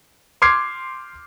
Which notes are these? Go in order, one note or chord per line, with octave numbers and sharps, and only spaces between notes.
C6 D6 F6 G#6 C7